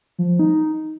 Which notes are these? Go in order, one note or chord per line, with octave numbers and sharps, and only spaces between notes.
F3
F3
D#4